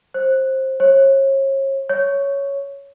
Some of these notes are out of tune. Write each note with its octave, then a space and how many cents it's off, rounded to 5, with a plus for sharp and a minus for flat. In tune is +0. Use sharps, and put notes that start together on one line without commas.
C5 +20
C#5 -35
C#5 +5